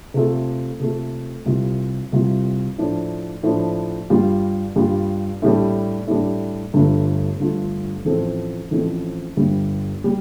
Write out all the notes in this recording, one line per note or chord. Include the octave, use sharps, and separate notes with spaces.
C3 A3 F4 A4
C3 A3 F4 A4
C2 C3 G3 F4
C2 C3 G3 F4
A2 F3 D4
A2 F3 D4
G2 G3 F4
G2 G3 F4
A2 G3 D4
A2 G3 D4
G1 G2 D3 A3 F4
G1 G2 D3 A3 F4
A1 A2 F3 C4 A4
A1 A2 F3 C4 A4
G1 G2 G3
G3